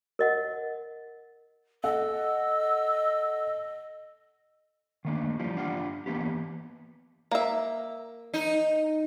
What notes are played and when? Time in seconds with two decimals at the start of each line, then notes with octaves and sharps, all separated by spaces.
0.19 A#4 D#5 F#5
1.84 A4 D#5 F#5 E6
5.05 D#3 A3 A#3 D4
5.39 E3 F3 G3
5.56 D4 F4 G4 F#5
6.06 E3 A#3 B3 G4
7.31 A#3 E5
8.34 D#4